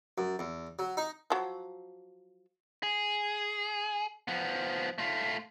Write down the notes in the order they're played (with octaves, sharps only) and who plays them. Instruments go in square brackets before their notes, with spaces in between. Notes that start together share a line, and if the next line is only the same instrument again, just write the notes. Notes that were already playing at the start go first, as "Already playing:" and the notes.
[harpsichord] F#2
E2
F#3
D#4
[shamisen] F3 F#3
[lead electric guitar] G#4
F3 B3
A3 F4